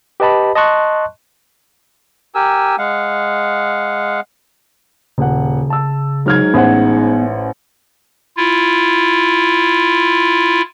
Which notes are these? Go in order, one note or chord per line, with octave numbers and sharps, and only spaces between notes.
G4 B4 D#5 A5 B5
D#5 A5 C6 C#6 F#6
G4 A#4 G#5 E6
G#3 F5 F#5
D#1 C#3 F#5
A5 E6
G#2 F#3 F6 G#6
A1 B3 C5 F#5
E4 F4